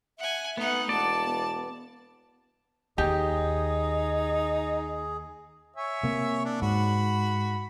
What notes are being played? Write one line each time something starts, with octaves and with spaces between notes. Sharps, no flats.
E5 F#5 G#5
A3 B3 D#4 F#5
E1 D5 F#5 A5
B3
D#2 D#4 G4 G#4
C#5 E5 G#5
C3 A#3
D4
G#2 F#4 B5